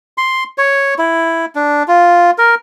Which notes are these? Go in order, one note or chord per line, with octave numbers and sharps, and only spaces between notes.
C6
C#5
E4
D4
F4
A#4